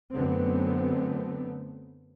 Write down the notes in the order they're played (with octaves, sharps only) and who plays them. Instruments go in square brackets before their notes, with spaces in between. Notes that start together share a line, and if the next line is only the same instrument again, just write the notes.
[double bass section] F#2 D3 A3 B3 C4